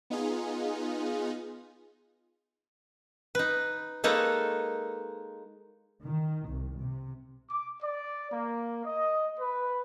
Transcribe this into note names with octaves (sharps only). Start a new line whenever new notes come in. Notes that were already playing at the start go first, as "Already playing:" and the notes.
B3 D#4 F4 G#4
D#4 B4
G#3 A#3 D#4 A4 B4 C#5
D#3
C2
C3
D6
D5
A#3
D#5
B4